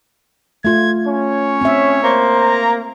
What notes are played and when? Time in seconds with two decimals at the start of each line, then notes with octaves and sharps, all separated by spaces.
0.65 A3 F4 G#6
1.07 C#4 C#5
1.61 C4 E5
2.04 A#3 C5
2.36 A#5